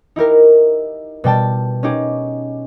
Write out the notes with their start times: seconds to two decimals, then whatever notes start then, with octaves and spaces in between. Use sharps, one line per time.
0.16 D#4 E4 G4 A#4
1.24 B2 G3 G5 A5
1.83 C#4 D#4 G4 G#4